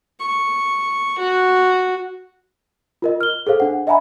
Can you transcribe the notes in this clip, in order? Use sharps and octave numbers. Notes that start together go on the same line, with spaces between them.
C#6
F#4
F4 A#4 D#5
F6 G7
G#4 A4 C5 F5
D4 F#5
D#5 E5 F#5 G#5 A#5 B5